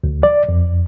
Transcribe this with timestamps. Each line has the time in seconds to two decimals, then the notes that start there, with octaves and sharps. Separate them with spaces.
0.04 D2
0.23 D5
0.49 F2